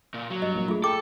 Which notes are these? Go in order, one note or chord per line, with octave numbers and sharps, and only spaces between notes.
A#2
F#3
G2 D#5
A#1 A#3
A3 F4 G#4
A4 G5 D6